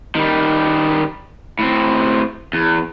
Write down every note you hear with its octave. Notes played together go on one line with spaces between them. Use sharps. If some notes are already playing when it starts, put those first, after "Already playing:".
D#3 G3
A2 C4
E2